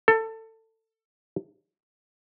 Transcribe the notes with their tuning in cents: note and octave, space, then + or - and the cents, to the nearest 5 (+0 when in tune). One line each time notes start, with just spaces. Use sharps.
A4 +20